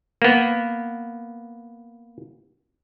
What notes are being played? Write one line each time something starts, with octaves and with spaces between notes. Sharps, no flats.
A#3 B3